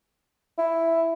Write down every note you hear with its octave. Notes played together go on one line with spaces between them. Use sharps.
E4